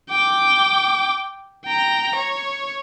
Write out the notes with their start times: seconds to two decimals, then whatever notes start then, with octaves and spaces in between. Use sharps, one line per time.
0.10 G5 D6
1.66 G5 A#5
2.16 C#5